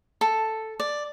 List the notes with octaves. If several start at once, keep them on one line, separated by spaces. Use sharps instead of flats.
A4
D5